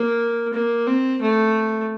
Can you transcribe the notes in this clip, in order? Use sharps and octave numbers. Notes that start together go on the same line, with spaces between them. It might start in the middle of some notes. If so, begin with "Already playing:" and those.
Already playing: A#3
A#3
C4
A3